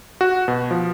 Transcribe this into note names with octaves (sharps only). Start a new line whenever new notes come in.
F#4
B2
F3